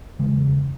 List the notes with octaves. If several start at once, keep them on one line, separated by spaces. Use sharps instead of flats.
F#1 E2 C#3 E3 G#3